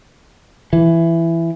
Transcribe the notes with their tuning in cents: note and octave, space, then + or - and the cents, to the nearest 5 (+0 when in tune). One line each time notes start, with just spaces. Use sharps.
E3 +10